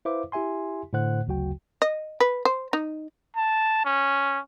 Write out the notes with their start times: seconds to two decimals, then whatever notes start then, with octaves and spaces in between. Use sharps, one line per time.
0.05 E4 B4 C5 E5 F5 D6
0.32 E4 G4 E5 G#5 C6
0.93 A2 D3 A3 C5 F#5 F#6
1.26 G#1 D2 C#3 F#3 F#4 G5
1.82 D#5
2.20 B4
2.45 C5
2.73 D#4
3.36 A5
3.85 C#4